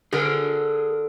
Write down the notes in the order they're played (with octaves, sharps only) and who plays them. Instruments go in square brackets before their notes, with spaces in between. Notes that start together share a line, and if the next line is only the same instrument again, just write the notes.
[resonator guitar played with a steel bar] D3 [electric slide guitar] G#4 A#4